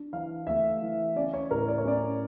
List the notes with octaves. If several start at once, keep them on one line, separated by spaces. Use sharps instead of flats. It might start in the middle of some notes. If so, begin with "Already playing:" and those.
Already playing: D4
E3 F5
A3 E5
E3
C#4 D5
C#5
A2 A#4
D5
C#5
C#4 D5